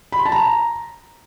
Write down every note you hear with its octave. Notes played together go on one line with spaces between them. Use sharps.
B5
C6
A5
A#5